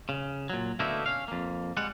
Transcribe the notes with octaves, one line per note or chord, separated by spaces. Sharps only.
C#3
A#2 F#3
B2 D3 A3 A#3 D#4 E4
C#4 F5
F2 A#3
G3 G#3 F#5